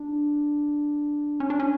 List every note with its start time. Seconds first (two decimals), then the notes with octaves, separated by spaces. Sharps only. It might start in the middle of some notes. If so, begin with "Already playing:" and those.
Already playing: D4
1.40 C#4
1.50 D4
1.60 C#4